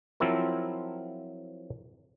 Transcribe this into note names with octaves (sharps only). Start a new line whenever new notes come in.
F3 F#3 C4 E4 F4 A#4